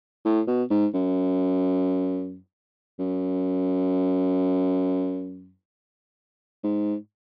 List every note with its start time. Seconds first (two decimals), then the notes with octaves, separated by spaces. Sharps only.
0.25 A2
0.47 B2
0.70 G#2
0.94 F#2
2.99 F#2
6.64 G#2